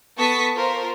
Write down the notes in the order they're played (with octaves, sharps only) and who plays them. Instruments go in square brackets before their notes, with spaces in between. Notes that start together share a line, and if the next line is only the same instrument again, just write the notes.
[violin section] B3 A4 A5 C#6 D#6 B6
F4 A#4 C5